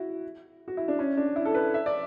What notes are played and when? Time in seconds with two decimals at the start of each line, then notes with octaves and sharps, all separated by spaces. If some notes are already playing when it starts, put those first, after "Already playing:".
Already playing: E4 F#4
0.68 F#4
0.77 E4
0.88 D4
0.99 C#4
1.17 D4
1.36 E4
1.46 A4
1.54 B4
1.74 E5
1.86 D5